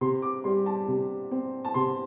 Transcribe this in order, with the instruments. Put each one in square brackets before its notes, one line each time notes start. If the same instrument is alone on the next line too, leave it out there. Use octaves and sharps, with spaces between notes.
[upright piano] C3 C6
D6
G3 C6
A5
C3
C4
A5
C3 C6